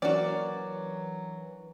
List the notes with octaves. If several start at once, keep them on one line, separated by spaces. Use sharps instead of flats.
E3 F#3 A#3 C#4 D4 F#4 D5